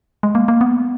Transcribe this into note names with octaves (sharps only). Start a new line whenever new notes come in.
G#3
A#3
A#3
B3